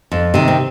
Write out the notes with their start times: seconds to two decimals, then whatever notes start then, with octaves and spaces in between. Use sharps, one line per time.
0.12 F2
0.34 C3 D#3
0.48 C4